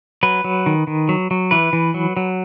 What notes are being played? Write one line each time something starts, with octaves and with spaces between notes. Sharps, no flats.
F#3 B4
F#3
D#3
D#3
F#3
F#3
E3 B4
E3
F#3
F#3